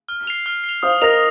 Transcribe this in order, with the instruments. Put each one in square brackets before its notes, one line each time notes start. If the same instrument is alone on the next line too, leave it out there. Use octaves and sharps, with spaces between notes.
[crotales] F6
C7 F7
F6
C7
F7
[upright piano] C5 F5 [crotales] D#6
[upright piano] A#4 D#5 [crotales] A#6 F7